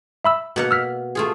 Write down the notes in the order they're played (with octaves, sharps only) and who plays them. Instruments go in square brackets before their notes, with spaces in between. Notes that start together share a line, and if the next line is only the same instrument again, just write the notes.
[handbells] E5 B5 E6
[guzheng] B2 A#3 F#5
[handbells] E6 F6 B6
[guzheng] A3 F4 G#4